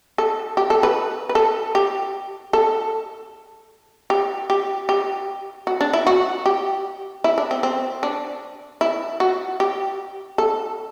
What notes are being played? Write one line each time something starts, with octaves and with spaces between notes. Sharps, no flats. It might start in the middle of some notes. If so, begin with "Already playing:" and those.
A4
G4
A4
B4
B4
A4
G4
A4
G4
G4
G4
F#4
D4
E4
F#4
G4
E4
D4
C4
C4
D4
E4
F#4
G4
A4